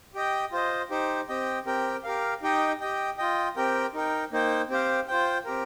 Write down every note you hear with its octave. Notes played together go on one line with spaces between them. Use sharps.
G4 D#5 G5
F4 C5 D#5
D#4 G4 C5
C4 G4 D#5 G5
C4 G4 A#4 G5
G4 A#4 F5
D#4 G4 D#5 G5
G4 D#5 G5
F4 D#5 G5
C4 G4 A#4 G5
D#4 A#4 G5
A#3 D#4 C5 G5
C4 G4 C5 F5
F4 C5 G5
C4 G4 A#4